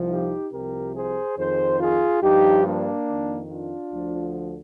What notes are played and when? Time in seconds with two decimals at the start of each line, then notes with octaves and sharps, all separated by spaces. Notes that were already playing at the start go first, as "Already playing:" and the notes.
Already playing: C2 C3 F3
0.10 D#4 G4
0.52 C2 C3 F3 G4 A#4
0.95 G#4 C5
1.37 F2 D#3 G#4 C5
1.80 F4 G#4
2.22 G2 F3 D#4 G4
2.65 A#3 D4
3.07 F2 D#3
3.50 D4 F4
3.92 D2 D3 F3